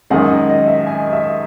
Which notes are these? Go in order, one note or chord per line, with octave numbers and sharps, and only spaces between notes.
F#2 D#3 G#3 D#4 G#4 F#5
D#5
D#5
E5
G#5
E5